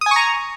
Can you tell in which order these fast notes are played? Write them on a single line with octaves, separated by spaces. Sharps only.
D#6 G#5 C#6 A#5